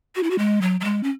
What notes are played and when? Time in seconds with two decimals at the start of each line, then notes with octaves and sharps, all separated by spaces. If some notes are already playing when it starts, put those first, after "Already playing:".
0.16 F#4
0.23 E4
0.31 F#4
0.39 G#3
0.62 F#3
0.81 F#3
0.84 G#3
1.03 C#4